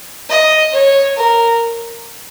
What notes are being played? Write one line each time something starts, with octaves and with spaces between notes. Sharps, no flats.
D#5
C#5
A#4